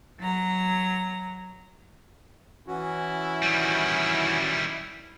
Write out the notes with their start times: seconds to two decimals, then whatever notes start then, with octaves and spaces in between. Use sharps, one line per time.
0.20 F#3 A#5
2.67 E3 C#4 E4 F#4
3.43 D#3 G3